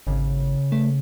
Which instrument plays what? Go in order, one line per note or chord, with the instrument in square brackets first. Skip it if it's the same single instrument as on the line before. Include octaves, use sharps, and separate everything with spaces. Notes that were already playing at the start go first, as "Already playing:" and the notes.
[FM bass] G#1 [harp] C#3
[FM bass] A3